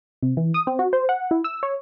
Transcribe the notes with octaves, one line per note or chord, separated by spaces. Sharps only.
C3
E3
D#6
C4
F#4
C5
F#5
E4
E6
C#5